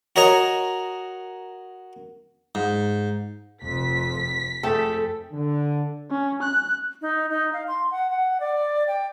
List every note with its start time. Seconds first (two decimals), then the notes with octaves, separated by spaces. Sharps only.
0.16 F#4 A#4 C#5 D#5 A#5
2.55 G#2
3.63 F1 F2 B6
4.63 F2 A3 G#4 A4 G5
5.32 D3
6.10 C#4
6.43 F#6
7.02 D#4
7.30 D#4
7.53 F5
7.68 C6
7.91 F#5
8.10 F#5
8.40 D5
8.87 G5